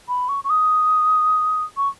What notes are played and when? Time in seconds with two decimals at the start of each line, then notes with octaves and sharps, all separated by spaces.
0.08 B5
0.29 C#6
0.44 C#6
0.50 D#6
1.77 C#6